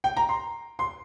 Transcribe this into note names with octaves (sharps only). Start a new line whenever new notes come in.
G5
A#5
C6
C6